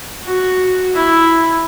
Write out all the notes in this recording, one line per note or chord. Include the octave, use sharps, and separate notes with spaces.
F#4
E4